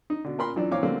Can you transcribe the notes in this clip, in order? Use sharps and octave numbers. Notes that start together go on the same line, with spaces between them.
D#4
B2 D3
A#2 A#4 B5 C6
F#2 E3 F3 D4
A#2 E3 C4 C#5 F5 D6
D3 F#3 G3 A3 A#3 C4